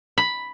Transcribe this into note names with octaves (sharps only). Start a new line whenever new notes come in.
B5